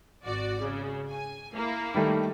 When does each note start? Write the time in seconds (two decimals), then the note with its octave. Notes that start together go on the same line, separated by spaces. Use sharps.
0.24 G#1 F#4 D5
0.60 C#3
1.10 G#5
1.53 A#3 E4
1.94 D#3 G3 A3